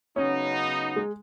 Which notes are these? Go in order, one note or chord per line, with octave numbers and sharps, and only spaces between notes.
C#3 F#3 B3 C#4 D#4
G#3